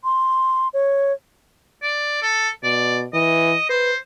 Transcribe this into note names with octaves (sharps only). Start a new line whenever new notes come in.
C6
C#5
D5
A4
B2 D5
E3 D#5
B4 C5